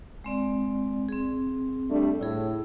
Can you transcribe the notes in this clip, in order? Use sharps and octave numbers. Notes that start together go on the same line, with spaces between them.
G#3 C4 D5
C4 G#4
G3 A3 D4
A2 E4 G#4